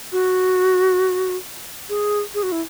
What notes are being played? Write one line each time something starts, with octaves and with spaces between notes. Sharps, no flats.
F#4
G#4
G#4
F#4
E4